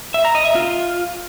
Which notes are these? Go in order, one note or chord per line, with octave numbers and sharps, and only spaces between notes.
E5
A#5
D#5
E5
F4